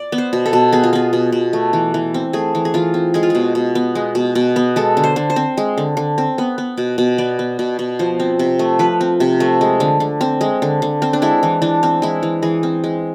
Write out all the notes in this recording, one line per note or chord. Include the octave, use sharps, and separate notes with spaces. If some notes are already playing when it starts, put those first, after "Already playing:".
Already playing: D5
B3
C5
B2
A4
B2
B3 G#4
F4
B3 G#4
B2
B2
A3
E3
E3
C4
A3 G#4
E3
G#4
E3 F4
C4
G#3 G#4
F4
B2 G#4
B2
B3
G#3
B2
B2
B3
G#3 A4
D3
C5
D3
C5
C4
G#3
D3
D3
C4
B3
B3
B2
B2
B3 D5
B3
B2
B2
F3 C5
C4
C3
A3
F3 B4
C4
C3
A3
G#3
D3
D3
C4
G#3
D3
D3
C4
D4
G#3 E4
E3
E3 D4
C4
G#3 E4
E3
E3 G#4
C4
G#3